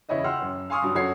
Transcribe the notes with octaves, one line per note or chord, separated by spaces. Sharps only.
E2 C#3 E4 C#5 D#5 E5
F#5 G5 C6 E6 F6
F#2
F5 G#5 C6 C#6 D#6 F6
G2 F#3
F#2 F#4 A4 C#5 C7